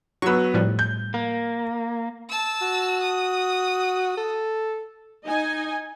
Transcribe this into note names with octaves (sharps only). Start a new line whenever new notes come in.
F#3 B3 C#6 E6
A2 F3 G3
G6
A#3
A5 E6
F#4
D#6
A4
D#4 D#5 G#5